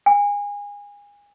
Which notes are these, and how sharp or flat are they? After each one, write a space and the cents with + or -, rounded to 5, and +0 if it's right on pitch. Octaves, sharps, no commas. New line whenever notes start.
G#5 -25